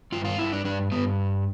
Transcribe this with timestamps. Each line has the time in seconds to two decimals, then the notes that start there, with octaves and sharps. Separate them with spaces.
0.12 G2 F4
0.25 F4
0.38 G2 E4
0.52 D4
0.65 G2 D4
0.91 G2 B3